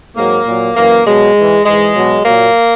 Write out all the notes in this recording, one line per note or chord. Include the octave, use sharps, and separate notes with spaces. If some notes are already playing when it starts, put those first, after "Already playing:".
G#2 F#3 A#3
A#2 F#3
F#2 E3 A#3
B2 F#3 G#3
G#2 E3
G#2 E3 G#3
B2 F#3
A#2 F#3 A#3